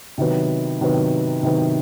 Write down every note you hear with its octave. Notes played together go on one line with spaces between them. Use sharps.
C3 D#3 F#3 B3
C3 D#3 F#3 B3
C3 D#3 F#3 B3